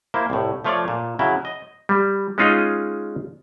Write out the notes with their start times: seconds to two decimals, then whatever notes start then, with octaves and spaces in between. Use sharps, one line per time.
0.14 A#3 E4 C5
0.30 C2 A2
0.64 F3 A3 F4 C#5 D5
0.88 A#2
1.19 C#3 F#3 E4
1.45 D#5
1.89 G3
2.38 G#3 C#4 D#4 F4 G#4 D#5